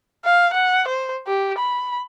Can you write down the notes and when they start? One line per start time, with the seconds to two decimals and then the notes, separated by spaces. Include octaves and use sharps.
0.24 F5
0.53 F#5
0.88 C5
1.27 G4
1.58 B5